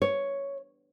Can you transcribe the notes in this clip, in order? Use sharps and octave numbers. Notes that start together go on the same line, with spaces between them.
C#5